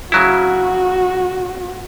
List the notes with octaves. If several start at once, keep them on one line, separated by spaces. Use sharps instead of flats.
C#3 F#3 E4 F#4